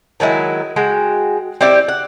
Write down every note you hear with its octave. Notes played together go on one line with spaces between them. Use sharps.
D#3 F#3 G#3 E4
G#3 F#4 G5
C4 E4 G4 D5
F#5